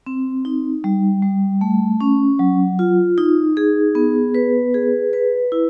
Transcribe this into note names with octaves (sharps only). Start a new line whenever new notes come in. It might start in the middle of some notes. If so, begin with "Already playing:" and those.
C4
D#4
G3
G3
A3
C#4
F#3
F4
D#4
G#4
B3
B4
G#4
B4
E4